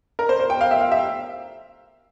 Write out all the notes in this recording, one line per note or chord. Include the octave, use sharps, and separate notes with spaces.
A#4
C5
C5
G5
F5
E5
F5
E5